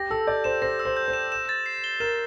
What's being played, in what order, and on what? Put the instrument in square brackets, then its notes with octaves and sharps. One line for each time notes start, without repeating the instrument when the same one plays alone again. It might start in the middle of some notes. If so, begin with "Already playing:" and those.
Already playing: [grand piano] G4 [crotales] A#6
[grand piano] A4 [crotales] E6
[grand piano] D5 [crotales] G6
[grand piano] C5 [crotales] E7
[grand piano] C5 [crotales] A#6
[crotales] E6
[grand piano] C5
[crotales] G6
[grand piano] C5
[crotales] E7
E7
A6
C7
G7
[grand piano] A#4 [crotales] E7